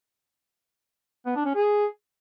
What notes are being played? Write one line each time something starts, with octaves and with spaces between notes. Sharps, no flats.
B3
D4
C#4
G#4